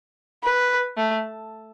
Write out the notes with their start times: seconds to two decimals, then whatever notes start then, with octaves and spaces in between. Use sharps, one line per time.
0.43 B4
0.97 A3